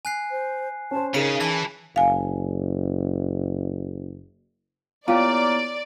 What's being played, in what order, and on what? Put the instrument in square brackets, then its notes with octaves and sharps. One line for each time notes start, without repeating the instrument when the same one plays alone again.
[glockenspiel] G#5 F#6 C7
[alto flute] C5
[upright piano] C#4 C5 [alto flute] A5
[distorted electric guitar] C#3 [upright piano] C#4 G#4 A#4 [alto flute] D#4 [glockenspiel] B6 D#7
[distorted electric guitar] E3 [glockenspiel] A5
[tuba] F#1 [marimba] F5 G#5
[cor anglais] A#3 [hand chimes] B3 E4 C#5 [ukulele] F4 G4 [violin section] D5